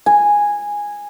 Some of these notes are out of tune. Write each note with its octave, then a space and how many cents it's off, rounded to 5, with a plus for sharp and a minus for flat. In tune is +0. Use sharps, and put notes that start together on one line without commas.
G#5 -10